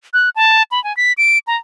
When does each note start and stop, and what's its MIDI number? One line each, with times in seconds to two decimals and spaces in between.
0.14 0.29 90
0.36 0.63 81
0.71 0.82 83
0.84 0.95 80
0.97 1.13 95
1.18 1.38 98
1.47 1.57 82